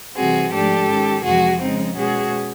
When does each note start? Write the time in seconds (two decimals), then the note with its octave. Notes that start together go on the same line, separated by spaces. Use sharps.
0.16 C3 E3 G3 C4 F#4 G#4
0.53 G#2 F3 A3 D4 G4 A4
0.89 D#3 G#3 C#4
1.24 F2 C3 E3 G#3 F#4 G#4
1.60 C#3 F3 G#3 C4 D#4
1.96 B2 G#3 C#4 F#4 G#4